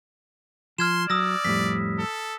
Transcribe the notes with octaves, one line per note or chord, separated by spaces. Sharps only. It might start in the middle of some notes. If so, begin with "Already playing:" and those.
F3 C6 F6 G#6 E7
F#3 D5 D#6 E6 A#6
F2 A2 G3 B6
A4